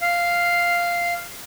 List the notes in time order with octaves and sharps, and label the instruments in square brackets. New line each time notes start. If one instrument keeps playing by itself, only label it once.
[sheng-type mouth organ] F5